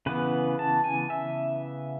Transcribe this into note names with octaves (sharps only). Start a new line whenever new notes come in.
C#3 E3 B3 B4
A5
G#5
E5